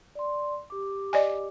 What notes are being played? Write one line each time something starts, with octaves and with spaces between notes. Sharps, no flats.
D5 C6
G4 D6
D5 D#5 G#5